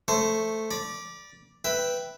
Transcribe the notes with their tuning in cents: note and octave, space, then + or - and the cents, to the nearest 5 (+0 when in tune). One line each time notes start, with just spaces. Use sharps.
A3 +0 C5 -10 C#6 +0
D5 +0 B5 -40
B4 +0 E5 +0 G5 +0